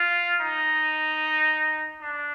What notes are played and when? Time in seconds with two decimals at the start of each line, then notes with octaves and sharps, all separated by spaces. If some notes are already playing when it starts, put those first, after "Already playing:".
Already playing: F4
0.41 D#4
2.02 D4